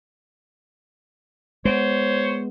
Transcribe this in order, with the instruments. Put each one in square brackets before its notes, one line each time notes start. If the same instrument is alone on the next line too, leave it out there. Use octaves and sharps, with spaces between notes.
[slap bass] G#3 A3 B3 [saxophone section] C5 C#5